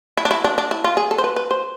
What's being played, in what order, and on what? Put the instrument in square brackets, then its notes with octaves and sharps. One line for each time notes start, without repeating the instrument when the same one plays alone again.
[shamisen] E4
D4
E4
D4
D4
E4
F4
G#4
A4
C5
B4
B4
C5